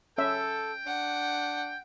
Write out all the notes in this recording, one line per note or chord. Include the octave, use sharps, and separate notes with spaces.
C#4 A4 E5 G5
D4 F#5